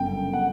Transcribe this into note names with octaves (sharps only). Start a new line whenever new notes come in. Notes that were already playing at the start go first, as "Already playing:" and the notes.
Already playing: G1 F#2 C#3 G5
F#5